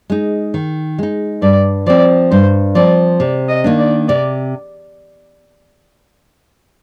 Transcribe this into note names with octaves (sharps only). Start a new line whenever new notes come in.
G#3 D#4
D#3
G#3 D#4
G2 D5
F3 C4 D5
G2 C5
F3 C4 D5
C3 D5
D#5
D#3 A#3 D4
D5
C3 D5